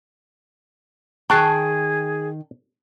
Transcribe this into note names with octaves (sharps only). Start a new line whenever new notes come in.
D#3 G#4 G5 A5 C#6 F#6 C7